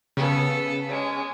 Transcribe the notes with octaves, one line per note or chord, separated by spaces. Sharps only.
C#3 B3 A4
G#3 C#4